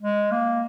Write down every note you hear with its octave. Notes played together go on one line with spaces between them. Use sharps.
G#3
A#3